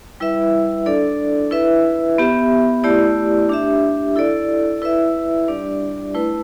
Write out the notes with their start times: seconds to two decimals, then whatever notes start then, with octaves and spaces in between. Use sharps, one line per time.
0.20 G3 E4 B4 E5
0.86 D4 A4 D5
1.51 E4 B4 E5
2.18 B3 G4 E5
2.84 A3 E4 G4 D5
3.49 D4 G4 E5
4.16 E4 A4 D5
4.82 E4 B4 E5
5.48 G3 D4 G4 D5
6.14 A3 E4 B4